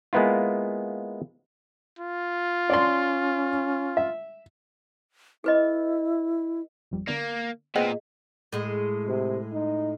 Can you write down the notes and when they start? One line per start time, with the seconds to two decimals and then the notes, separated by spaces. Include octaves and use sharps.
0.13 G#3 A#3 B3 E4 F4
1.99 F4
2.70 C#4 D5 C6
3.97 E5
5.44 E4 G#4 B4 D#5
6.91 G#1 F2 G3
7.07 D3 A#3 B3 D5
7.76 A#2 G#3 B3 C4 G#4 D#5 G5
8.53 A2 G#3
9.07 C3
9.53 D#4